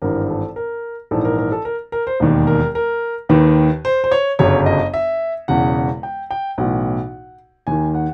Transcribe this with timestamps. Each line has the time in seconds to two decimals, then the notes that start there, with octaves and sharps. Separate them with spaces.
0.02 G#1 G2 E3 A#4
0.29 A4
0.56 A#4
1.11 A#1 G#2 E3 A4
1.25 A#4
1.38 A#4
1.52 A4
1.65 A#4
1.92 A#4
2.07 C5
2.20 E1 D#2 D#3
2.47 A#4
2.75 A#4
3.29 D#2 D#3 B4
3.85 C5
4.04 C5
4.12 C#5
4.39 G1 F#2 C#3 C#5
4.66 D#5
4.94 E5
5.48 E1 E2 C#3 F#5
6.03 G5
6.31 G5
6.58 B1 A2 E3 F#5
7.67 D#2 D#3 G#5
7.94 F#5